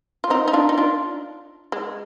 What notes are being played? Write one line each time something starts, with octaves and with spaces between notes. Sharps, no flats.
F4
C4 D#4
D#4
D4 F4
D#4
D4 F4
G#3